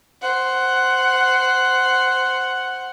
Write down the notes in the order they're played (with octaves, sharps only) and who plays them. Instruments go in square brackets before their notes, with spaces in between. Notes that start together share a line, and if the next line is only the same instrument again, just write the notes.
[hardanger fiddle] C5 F#5